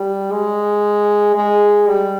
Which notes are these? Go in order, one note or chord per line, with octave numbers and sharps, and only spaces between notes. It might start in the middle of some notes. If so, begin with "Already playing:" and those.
Already playing: G3
G#3
G#3
G3